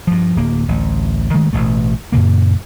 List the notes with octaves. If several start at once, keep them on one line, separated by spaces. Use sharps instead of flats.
G2 F3
D1 A#3
A1 D2
D#3 G#3 A3
A1 B2 A3
F#2 A#2 C#3 A#3